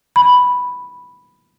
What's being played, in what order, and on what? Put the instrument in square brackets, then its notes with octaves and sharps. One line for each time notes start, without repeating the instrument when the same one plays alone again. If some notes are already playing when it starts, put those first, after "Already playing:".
[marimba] B5